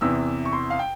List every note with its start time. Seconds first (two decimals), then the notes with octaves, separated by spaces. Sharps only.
0.01 E2 C3 E3 E6
0.45 C#6
0.52 C6
0.70 F5
0.79 G5